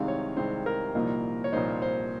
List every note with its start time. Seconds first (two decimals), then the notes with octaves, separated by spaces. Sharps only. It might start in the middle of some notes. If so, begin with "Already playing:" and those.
Already playing: C2 C3 D#3 G#3 C4 F5
0.08 C#5
0.37 C2 C3 D#3 G#3 C4 C5
0.66 A#4
0.95 C2 A#2 F3 A#3 D#4
1.44 C#5
1.52 C2 A#2 F3 A#3 D#4 C5
1.82 C5